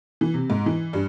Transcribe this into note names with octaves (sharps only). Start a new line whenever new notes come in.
E3
C3
G#2
E3
G2